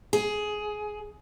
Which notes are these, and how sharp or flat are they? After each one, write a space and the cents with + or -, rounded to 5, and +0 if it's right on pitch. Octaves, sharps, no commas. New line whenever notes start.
G#4 +15